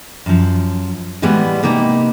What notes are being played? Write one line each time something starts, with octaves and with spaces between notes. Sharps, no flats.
F#2 F3
A2 E3 G3 G#3 B3
C3 A#3 D#4 G4 B4